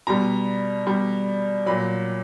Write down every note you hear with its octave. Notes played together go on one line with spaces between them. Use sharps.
B2 G3 A#5
B2 G3
A#2 F#3 B5